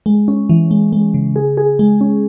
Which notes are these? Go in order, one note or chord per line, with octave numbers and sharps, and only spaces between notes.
G#3
C#4
E3
G#3
G#3
C#3
G#4
G#4
G#3
C#4